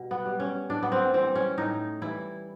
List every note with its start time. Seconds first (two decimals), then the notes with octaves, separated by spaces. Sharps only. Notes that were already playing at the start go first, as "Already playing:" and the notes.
Already playing: B2 G3
0.11 B3
0.26 G3
0.40 C#4
0.70 A2 D4
0.83 B3
0.92 C4
1.14 E3 G3 C4
1.35 C#4
1.58 A2 D#4
2.02 E3 G3 E4